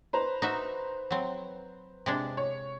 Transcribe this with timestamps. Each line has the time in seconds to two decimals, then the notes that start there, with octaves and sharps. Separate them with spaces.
0.13 B4 C5 A#5
0.42 D#4 F#4 E5
1.11 F#3 C4
2.06 C3 G#3 D4
2.37 C#5